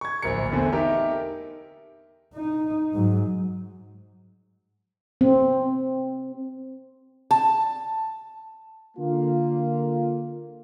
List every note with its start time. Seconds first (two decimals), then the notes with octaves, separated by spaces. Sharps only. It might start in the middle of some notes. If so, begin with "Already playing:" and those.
0.01 C#6 G#6
0.22 D1 A#1 A#4 C#7
0.52 E2 D3 A3 C4
0.72 D#4 G4 A#4 E5
2.34 D#4
2.93 G#2 F#3
5.21 C4
7.31 A5
8.97 D3 A#3 F4